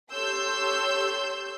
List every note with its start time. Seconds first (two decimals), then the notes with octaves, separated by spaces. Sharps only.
0.12 G4 A4 C#5 C6 E6 G6